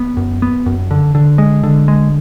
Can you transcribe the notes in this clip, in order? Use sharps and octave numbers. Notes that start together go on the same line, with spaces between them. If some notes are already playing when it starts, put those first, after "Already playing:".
Already playing: B3
F#2
B3
F#2
D3
D3
G#3
D3
G#3